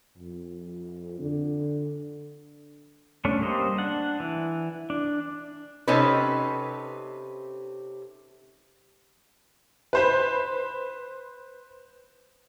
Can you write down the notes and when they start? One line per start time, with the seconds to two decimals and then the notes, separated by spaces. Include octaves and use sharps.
0.18 F2
1.20 D3
3.25 A3 C#4 D4
3.41 G3 A#3 C4 C5 D#5
3.78 D4 F#5
4.20 E3
4.90 D4
5.88 C3 C#4 D#4 A4 B4
9.93 B4 C5 B5